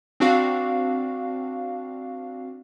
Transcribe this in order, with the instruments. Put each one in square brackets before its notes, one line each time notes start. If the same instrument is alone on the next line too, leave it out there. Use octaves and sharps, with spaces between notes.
[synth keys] C4 D4 F#4 F5